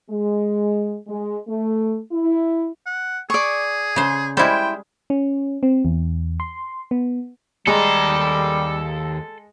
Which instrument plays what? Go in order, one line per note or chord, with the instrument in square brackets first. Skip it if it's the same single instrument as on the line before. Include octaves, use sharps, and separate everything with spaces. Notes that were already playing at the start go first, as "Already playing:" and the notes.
[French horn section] G#3
G#3
A3
E4
[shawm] F#5
[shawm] G#4 [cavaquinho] D5 C#6
[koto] C#3 C5
[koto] G3 G#3 [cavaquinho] E4 C5 [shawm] G5
[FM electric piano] C#4
C4
E2
C6
B3
[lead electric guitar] D#2 A#5 [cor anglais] G3 [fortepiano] G#3 [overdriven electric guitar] A4